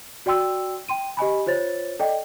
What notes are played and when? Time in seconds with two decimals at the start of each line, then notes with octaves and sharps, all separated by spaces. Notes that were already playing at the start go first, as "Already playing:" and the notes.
0.26 F#4 D5 G5 C6 E6
0.89 G5 C6 D#7
1.17 G4 D#5 G#5 B5
1.46 F4 C5 C#5 A6
1.99 A4 D5 D#5 G5